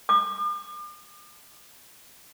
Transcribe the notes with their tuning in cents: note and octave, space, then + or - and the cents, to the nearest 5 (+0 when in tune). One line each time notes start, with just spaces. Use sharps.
D6 +45